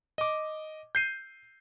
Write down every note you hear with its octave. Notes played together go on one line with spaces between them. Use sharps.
D#5 D6
G6 C7 D#7